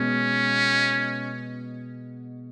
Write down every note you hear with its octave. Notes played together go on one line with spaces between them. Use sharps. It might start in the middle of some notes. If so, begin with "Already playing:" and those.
Already playing: B2 G#3 B3 C#4